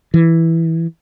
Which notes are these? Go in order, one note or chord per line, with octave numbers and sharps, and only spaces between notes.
E3